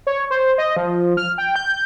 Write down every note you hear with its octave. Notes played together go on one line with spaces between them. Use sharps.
C#5
C5
D#5
F3
F6
G5
G6